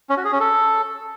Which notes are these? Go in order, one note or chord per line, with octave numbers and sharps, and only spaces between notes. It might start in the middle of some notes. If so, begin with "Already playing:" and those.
C#4
F#4
G#4
C#4
A4